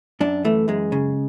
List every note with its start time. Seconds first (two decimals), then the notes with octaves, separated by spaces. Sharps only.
0.20 F#2 D4
0.44 E3 A3
0.68 F#2 G#3
0.92 C#3